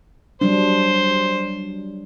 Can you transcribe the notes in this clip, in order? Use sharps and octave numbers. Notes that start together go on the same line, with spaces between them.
F#3 G3 D4 C5